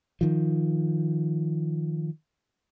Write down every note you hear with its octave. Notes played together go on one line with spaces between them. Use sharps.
D#3 F3